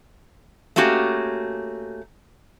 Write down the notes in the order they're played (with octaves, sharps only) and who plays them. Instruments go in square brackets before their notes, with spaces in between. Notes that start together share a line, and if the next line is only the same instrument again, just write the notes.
[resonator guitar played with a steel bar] A3 A#3 C#4 F#4 G4